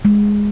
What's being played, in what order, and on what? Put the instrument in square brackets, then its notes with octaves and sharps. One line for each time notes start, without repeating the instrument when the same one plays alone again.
[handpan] G#3